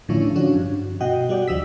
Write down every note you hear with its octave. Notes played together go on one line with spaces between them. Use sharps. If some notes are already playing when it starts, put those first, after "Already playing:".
A2 D3 F3 C#4 D4 E4
F3 C#4 D4 F#4
G2
B2 F#4 D#5 F#5 G5
G3 F#4 D5 F#5 G5
D2 F3 D#6 E6 B6